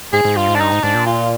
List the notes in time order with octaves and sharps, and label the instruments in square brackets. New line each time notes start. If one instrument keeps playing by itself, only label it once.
[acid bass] G#2 [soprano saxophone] G#4
[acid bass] G#2
[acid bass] G2 [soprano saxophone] F4
[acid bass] G#2
[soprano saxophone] D4
[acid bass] G2 [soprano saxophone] D#4
[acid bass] G#2
[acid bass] G#2 [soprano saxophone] D4
[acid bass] A#2
[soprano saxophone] F4